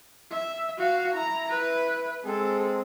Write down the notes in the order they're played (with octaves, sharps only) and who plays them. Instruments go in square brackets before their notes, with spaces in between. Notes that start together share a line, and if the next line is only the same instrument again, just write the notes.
[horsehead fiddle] E5
F#4 F5
[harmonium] E4 [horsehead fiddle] A#5
[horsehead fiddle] B4
[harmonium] G#3 C4 G#4 [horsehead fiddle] A4